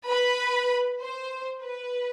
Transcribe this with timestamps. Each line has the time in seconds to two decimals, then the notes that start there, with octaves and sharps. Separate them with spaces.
0.08 B4 B5
1.01 C5
1.62 B4